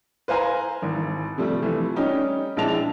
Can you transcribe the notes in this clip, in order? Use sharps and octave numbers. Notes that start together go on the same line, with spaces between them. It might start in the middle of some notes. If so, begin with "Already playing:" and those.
B4 C5 F5 G#5 A#5
G#1 E3
C3 F3 G3 A3
E3 F3 A3
G3 C#4 D#4 G4
A#1 G#3 C4 E4 A5 F7